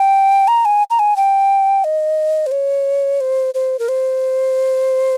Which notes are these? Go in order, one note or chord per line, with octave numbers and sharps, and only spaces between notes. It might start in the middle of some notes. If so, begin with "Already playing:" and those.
Already playing: G5
A#5
G#5
A#5
G#5
G5
D#5
C5
C#5
C5
C5
A#4
C5